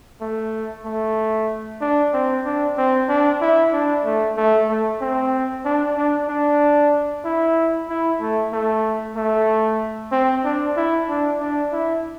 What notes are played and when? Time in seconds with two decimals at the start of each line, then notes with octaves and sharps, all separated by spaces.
0.21 A3
0.85 A3
1.81 D4
2.13 C4
2.45 D4
2.77 C4
3.09 D4
3.41 E4
3.73 D4
4.05 A3
4.37 A3
4.69 A3
5.01 C4
5.65 D4
5.97 D4
6.28 D4
7.24 E4
7.89 E4
8.21 A3
8.53 A3
9.16 A3
10.12 C4
10.44 D4
10.77 E4
11.09 D4
11.40 D4
11.72 E4